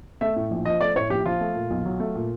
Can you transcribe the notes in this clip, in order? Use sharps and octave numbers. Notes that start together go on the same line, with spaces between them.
A3 E5
A2
A#1
F3 D#5
A3 D5
A2 C#5
A#1 G4
F3 F4
A3
A#2
B1
F#3
A3
A#2